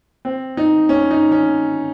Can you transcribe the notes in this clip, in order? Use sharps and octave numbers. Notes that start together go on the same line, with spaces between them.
C4
D#4
C#4
D#4
C#4